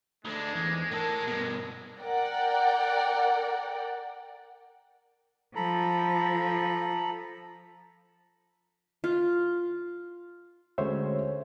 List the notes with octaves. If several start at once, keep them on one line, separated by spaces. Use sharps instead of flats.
D2 G#3 A3 D4
E2 G#2
A2 A4 A#4
G2 B2
A#4 D5 F#5 G5
F3 A4 A#5 B5
F4
D2 G#3 C#4 C5 C#5 E5